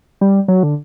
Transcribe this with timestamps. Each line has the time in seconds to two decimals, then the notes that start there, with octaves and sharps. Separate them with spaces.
0.21 G3
0.48 F#3
0.63 D3